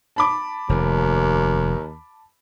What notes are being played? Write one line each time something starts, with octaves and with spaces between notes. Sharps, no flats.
A5 B5 D6
F1 D#2